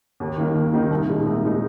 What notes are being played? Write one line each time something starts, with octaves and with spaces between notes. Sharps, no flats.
D#2
D#3 A#3 D#4
D#2
D#3 A#3 D#4
C2
A#2 G#3 D#4
C2
A#2 G#3 D#4